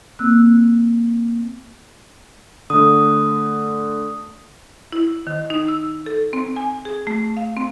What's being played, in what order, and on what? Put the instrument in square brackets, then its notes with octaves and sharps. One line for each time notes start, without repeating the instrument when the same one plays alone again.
[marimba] A#3 C4 E6 F#6
[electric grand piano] D3 A3 [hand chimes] D#6
[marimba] E4
D#3
D#4
E6
A4
C4
G#5
G#4
A3
F5
C4